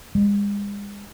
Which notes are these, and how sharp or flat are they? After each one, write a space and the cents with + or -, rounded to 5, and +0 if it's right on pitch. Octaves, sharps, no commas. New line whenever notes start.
G#3 -40